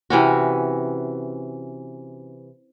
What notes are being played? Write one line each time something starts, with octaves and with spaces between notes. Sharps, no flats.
C3 E3 C#4 F#4